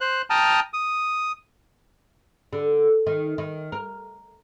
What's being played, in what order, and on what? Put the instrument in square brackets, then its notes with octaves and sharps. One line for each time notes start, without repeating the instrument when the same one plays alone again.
[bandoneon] C5 F#6
G5 A5 A#5 D#6 F6
D#6
[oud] D3
D#3
D#3
A#4